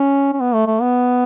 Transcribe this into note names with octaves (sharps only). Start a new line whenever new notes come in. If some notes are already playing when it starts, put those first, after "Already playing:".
Already playing: C#4
C#4
B3
A3
A3
B3